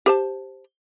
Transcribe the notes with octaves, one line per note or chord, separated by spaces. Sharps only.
G4 C5 A5